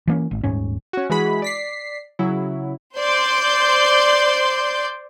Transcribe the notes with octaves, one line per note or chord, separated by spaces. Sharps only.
E3 A#3 C#4
G#1
D#1 G#2 C#4
C#4 F#4
E3 G#3 F#4 G#4 B5 B6
D5 B6 C7
C#3 F#3 E4
C5 D5 C6 G6